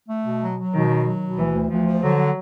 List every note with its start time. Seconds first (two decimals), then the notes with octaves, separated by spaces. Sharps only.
0.09 A3
0.25 B2
0.41 F#3
0.57 F#3
0.73 B2 D#3
0.89 F#3
1.06 F#3
1.21 B2
1.38 D2 E3
1.53 D2
1.70 D2 F3
1.85 F3
2.02 D3 F#3